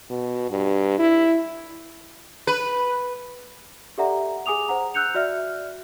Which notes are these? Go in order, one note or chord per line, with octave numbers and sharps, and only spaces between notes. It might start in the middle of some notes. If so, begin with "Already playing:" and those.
B2
G2
E4
B4
G4 A4 D5 E5 F#5 A#5
G#4 G#5 D6 D#6 F7
C5 F#5 A#5
E6 F#6 G6 C#7 F7
F#4 D5 E5 F6